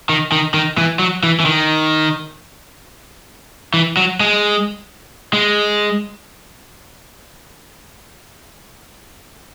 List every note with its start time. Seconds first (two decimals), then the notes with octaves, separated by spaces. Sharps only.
0.09 D#3
0.32 D#3
0.54 D#3
0.78 E3
0.99 F#3
1.23 E3
1.40 E3
1.46 D#3
3.74 E3
3.97 F#3
4.20 G#3
5.33 G#3